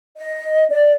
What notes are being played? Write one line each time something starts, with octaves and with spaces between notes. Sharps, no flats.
D#5
D5